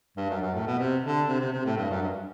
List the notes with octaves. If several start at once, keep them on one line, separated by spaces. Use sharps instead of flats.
G2
F#2
F#2
A2
B2
C3
D3
C3
C3
C3
A2
G2
F#2
G2